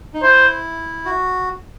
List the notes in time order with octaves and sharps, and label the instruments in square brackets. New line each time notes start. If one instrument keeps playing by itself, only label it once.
[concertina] D#4
[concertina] E4 [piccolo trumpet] C5
[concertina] F#4